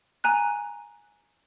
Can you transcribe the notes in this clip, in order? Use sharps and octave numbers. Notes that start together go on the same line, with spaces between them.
G#5 A#5 F#6